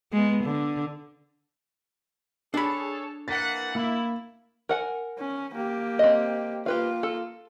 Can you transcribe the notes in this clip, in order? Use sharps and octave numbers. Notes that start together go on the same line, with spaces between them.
G#3 B3
D3
D4 G#4 A4 C#5 B5
E3 A#3 F#5 A6 B6
A#3 E4
A#4 F#5 G#5
C#4
A#3 G4
C4 D#5
A#3 F4 G4 B4 F5
A4